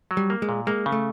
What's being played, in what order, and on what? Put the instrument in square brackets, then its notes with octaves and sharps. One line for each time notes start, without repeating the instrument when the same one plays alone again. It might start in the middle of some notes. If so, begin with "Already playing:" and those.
[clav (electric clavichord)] F#3
[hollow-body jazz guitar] G3
[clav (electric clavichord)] A#3
[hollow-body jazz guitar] G#3
[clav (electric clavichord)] A#2
[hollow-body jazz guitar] G#3 [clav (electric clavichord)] A#3
[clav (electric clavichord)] C#3
[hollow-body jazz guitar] A3